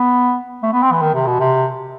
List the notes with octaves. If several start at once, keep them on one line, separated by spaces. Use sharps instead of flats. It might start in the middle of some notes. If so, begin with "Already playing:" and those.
Already playing: B3
A3
B3
C4
E3
D#3
C3
B2
C3